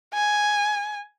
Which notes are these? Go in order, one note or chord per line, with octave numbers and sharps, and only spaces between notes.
G#5